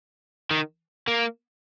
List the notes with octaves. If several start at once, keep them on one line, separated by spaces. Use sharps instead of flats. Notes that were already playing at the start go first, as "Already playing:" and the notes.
D#3
A#3